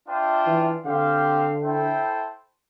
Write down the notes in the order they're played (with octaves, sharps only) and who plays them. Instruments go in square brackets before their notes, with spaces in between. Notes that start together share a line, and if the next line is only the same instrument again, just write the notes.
[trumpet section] D4 F4 C5 E5 G5
[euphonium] E3
[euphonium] D3 [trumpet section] C4 G4 C5 F5
[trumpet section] E4 A4 C5 E5 G5